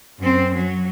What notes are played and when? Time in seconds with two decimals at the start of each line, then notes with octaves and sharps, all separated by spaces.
0.19 F#2 C4
0.54 F#3